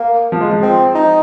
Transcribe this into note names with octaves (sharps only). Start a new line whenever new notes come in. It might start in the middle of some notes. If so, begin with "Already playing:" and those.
Already playing: A#3
F3
G#3
F3
C4
D#4